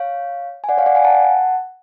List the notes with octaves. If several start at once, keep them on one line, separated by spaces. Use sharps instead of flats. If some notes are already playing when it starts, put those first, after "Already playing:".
Already playing: C#5 F5
G#5
D5 F#5
C#5 F5
D5 F#5
F5 G#5
F#5 A5